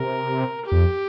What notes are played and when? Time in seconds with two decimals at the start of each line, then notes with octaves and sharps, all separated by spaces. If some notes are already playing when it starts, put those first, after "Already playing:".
Already playing: C3 A#4
0.65 G4
0.72 F2